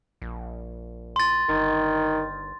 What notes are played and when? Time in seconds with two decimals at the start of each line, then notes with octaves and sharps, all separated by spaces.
0.22 A#1
1.16 C6 A6
1.49 G1 D#3